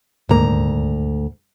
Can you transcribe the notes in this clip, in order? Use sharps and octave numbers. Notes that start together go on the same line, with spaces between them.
D#1 D2 G#2 A#3 A#5